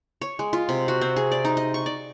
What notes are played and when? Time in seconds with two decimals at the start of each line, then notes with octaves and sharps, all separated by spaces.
0.21 C#5
0.39 G#3
0.53 F4
0.69 C3
0.88 F#4
1.01 C4
1.16 G#4
1.31 D5
1.45 D#4
1.57 D#5
1.74 C#6
1.86 D5